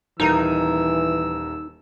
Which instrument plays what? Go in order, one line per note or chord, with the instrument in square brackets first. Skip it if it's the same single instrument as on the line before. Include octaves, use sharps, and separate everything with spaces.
[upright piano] D#1 A#4 D#7 [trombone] E3 [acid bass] D#4 [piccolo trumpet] E6